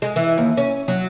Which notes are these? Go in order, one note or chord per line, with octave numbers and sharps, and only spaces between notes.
G#3
E3
D#2
C#4
F#3